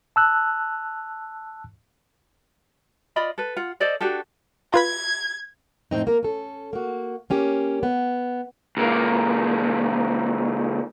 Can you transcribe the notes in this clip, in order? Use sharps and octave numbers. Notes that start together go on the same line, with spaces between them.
A5 E6 F#6
F4 D5 D#5 B5
A4 B4
F4 F#5
A4 C5 D5 D#5
D4 F#4 G4 A4
F4 B4 B5 G#6
F2 A2 C4 D#4
A#3 A#4
C#4 A4
A#3 F#4
A#3 C#4 G4
B3
C#2 A#3